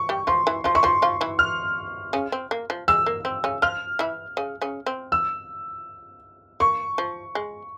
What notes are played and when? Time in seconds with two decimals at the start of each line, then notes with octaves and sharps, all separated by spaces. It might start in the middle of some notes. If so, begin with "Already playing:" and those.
Already playing: C#6
0.09 G3 G4
0.27 F3 F4 C6
0.47 E3 E4
0.64 F3 F4 C6
0.75 E4 C#6
0.83 F3 F4 C6
1.02 F3 F4
1.21 E3 E4
1.39 F6
2.13 C#3 C#4
2.32 C4
2.51 A#3
2.70 F3
2.88 G#3 E6
3.06 A#3
3.25 C4
3.44 C#3 C#4
3.62 F3 F4 F6
3.99 E3 E4
4.37 C#3 C#4
4.62 C#3 C#4
4.86 C4
5.12 E6
6.60 A#3 C#6
6.98 F3
7.35 G#3